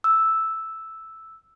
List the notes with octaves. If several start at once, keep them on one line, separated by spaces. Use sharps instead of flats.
E6